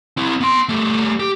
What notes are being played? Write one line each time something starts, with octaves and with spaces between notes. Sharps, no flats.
C4 E4
B3 C6
G3 A3
G4